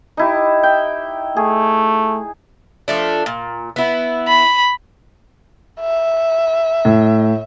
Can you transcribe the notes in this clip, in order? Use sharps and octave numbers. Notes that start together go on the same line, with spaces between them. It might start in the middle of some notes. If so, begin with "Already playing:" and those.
D#4 E4 G4
G5
A3 G#4
F3 A3 D4
A#2
B3 E4
B5
E5
A2